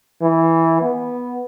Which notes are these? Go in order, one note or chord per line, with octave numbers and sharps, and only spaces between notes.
E3
B3